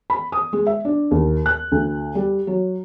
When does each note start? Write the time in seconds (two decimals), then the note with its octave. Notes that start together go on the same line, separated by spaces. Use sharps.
0.10 B5
0.32 D#6
0.53 G#3
0.67 E5
0.85 D4
1.11 D#2
1.46 F#6
1.72 D2
2.15 G3
2.47 F#3